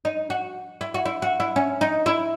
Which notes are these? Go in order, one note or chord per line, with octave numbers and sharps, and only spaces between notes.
D#4
F#4
E4
F#4
E4
F#4
E4
C#4
D#4
E4